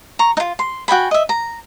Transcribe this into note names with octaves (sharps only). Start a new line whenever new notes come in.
A#5 C#6
D#4 F4
C6
F#4 G5 G#5 B5
D#5 E5
A#5